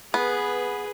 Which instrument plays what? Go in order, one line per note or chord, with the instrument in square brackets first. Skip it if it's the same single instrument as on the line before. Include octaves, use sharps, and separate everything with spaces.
[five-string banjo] B3 [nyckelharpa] G#4 B4